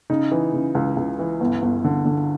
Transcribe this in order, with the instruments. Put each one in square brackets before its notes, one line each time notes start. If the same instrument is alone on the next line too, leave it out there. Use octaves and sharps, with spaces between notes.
[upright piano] C#3 D#4
E3
C#3
C#2
C#2
E3
G1
G1
D3
D3